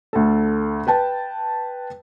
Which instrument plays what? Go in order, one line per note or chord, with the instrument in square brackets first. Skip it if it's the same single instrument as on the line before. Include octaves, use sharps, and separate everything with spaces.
[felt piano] D2 A4
B4 G5 A5